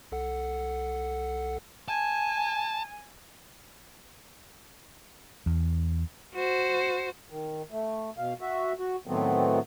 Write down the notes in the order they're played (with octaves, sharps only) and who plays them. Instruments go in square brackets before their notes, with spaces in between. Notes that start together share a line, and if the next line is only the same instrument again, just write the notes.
[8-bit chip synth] C2 A4 F#5
[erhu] G#5 [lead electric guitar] A5
[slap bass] E2
[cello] F#4 C5
[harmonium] D#3
A3
B2 F5
F#4 E5
F#4
A2 D#3 F#3 A3 B3 C4